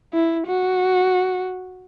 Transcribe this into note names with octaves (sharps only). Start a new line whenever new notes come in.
E4
F#4